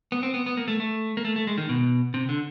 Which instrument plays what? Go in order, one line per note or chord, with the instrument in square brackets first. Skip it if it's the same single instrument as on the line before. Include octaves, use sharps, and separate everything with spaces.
[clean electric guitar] B3
C4
B3
B3
A#3
A3
A3
A#3
A3
A3
G#3
D#3
B2
C3
D3